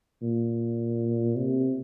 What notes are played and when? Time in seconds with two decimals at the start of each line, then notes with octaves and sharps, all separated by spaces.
0.22 A#2
1.36 C3